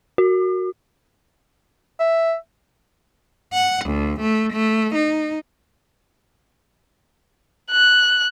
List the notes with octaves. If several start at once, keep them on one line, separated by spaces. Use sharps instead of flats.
F#4
E5
F#5
D2
A3
A3
D#4
F#6